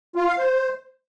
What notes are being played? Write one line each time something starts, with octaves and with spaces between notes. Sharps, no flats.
F4
F5
C5